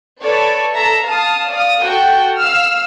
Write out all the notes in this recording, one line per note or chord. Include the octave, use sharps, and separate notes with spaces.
A4 B4 C#5 D5
A4 E5 A#5
F5 A5 D#6
D5 F5 D#6
F#4 A4 F#5 G5
F5 E6 F6